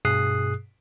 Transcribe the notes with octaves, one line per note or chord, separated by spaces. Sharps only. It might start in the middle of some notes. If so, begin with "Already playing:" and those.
G2 B2 G#4 D#6 F#6 C7